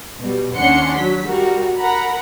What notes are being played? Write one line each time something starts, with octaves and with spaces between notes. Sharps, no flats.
B2 G3
D#2 C#4 D4 F#5 C6 C#7
F#3 B6
G3 F#4 A#4
A#4 F#5 A#5 B5